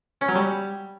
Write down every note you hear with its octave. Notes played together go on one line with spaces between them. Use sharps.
C#4
F#3
G3